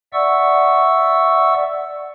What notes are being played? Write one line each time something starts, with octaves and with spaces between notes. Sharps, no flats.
D5 E5 F#5 C#6 E6